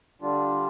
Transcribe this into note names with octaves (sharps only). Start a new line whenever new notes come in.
D3 G3 D4 F4